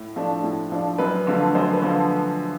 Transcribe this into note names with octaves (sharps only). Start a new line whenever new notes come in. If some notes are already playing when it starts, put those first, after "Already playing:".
Already playing: A2
F3 A3 D4
A2
F3 A3 D4
F#2 B4
D3 F3 A3
F#2 C5
B4
D3 F3 A3